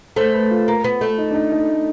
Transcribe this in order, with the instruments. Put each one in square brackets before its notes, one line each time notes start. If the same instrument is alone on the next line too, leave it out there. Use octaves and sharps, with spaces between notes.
[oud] A3 [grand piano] C5
[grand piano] B4
F4
[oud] A#3
B3
A3
[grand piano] D#4
D4
D#4
D#4